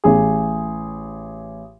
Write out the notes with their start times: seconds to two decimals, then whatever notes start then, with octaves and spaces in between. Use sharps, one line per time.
0.04 A1 G#4